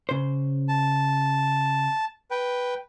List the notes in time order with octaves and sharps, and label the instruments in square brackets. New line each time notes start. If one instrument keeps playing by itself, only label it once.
[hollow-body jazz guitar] C#3 C5
[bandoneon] A5
B4 G5